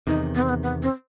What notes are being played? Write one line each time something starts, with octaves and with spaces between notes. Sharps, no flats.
E2 C3 D#3 D#4
B3
C4
B3
B3
C4